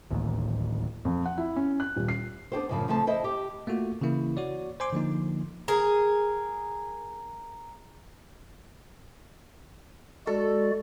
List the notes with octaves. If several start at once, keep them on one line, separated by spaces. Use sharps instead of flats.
D1 A1 D#2
F2
F#5
E4
C#4
F#6
D#1
C7
B3 D4 G4 C5
F#2 A2 C#3 E3 F3
C#3 F3 A3 C4 A5
E4 C5 D#5 E5
G4
A3 A#3 F4 F#4
C#3 E3 A#3 E4
F#4 C#5 D5
C5 G#5 C6 D6
D3 F3 A#3 D#4
G#4 A#4
G#3 F#4 A4 D5